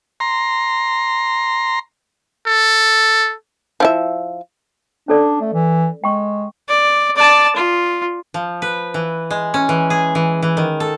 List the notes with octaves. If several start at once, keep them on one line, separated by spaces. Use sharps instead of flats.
A#5 C6
A4
F3 E4 E5
C#4 D4 A4 D5
A3
E3
G#3 G5 C#6
D5
D5 A5
F4
F3
B4
E3
G#3
C#4
E3
G#4
E3
E3
D#3
A4